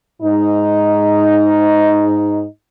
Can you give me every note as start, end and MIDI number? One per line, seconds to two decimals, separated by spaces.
0.22 2.44 44
0.22 2.44 63